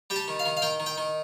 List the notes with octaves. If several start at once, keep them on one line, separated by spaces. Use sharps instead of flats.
G3 G5
A5
D#3
F5
D#3
F5
D#3 G5
D#3
G5
D#3